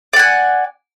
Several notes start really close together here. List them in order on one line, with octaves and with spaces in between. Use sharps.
D5 F#5 G#5